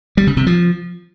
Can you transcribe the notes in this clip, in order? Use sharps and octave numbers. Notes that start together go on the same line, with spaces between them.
G3
C#3
C3
F3